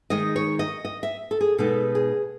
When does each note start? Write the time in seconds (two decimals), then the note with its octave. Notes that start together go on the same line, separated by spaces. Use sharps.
0.10 D#3 G#3 D#4 D#5
0.36 C#5
0.59 D#5
0.85 D#5
1.03 E5
1.31 A4
1.41 G#4
1.58 B2 G#3 B3 D#4 A4
1.95 G#4